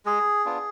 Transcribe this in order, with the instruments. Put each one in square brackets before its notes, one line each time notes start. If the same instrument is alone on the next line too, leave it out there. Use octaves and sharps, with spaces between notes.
[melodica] G#3 G#4
B3 D4 F4